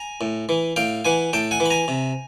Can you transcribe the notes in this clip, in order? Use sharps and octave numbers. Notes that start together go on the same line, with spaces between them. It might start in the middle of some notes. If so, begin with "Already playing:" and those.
Already playing: G#5 A#5
A2
E3
A2 F5 G5
E3 F#5 G#5
A2 G5 A5
F#5 G#5
E3
B5
G#5 A#5
C3